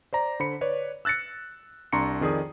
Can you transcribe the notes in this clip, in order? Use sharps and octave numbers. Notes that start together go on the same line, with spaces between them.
C5 D5 A#5
D3 C5 B5 C#7
B4 C#5 D5
E6 F#6 A6 A#6 C#7
C2 D4 A#5 C6 C#6 C#7
F2 D#3 G#4 D5 D#6